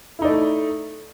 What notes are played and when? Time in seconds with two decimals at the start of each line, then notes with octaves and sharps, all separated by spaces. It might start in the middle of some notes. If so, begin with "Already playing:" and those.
0.19 E4
0.22 D#4
0.25 D5
0.28 A3